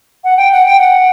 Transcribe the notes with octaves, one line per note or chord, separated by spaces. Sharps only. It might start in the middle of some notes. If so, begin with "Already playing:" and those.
F#5
G5
F#5
G5
F#5